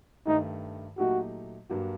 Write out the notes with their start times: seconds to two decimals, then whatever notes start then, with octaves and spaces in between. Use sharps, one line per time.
0.27 G2 D#3 A3 D#4
0.98 A#2 F#3 A3 D#4 F#4 G4
1.69 G2 F#3 A#3 D4 F#4